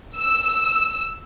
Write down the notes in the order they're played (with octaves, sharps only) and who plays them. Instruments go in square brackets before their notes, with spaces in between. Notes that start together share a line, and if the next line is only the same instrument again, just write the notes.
[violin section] E6